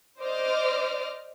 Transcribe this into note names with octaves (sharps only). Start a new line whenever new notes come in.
C5 D5 D#5 D6 F6